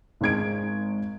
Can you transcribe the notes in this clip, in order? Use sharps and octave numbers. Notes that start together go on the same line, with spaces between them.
G#1 G#3 G#6 D7